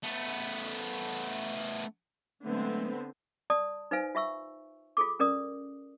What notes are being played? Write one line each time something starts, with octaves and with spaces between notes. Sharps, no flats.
A3 B3
D3 F#3 G#3 A3 B3 C4
D5 A5 D#6
D#4 B4 C5 F5 G#5
F4 E5 C#6 E6
F4 G#4 A4 D6
C#4 A#4 D5 D#6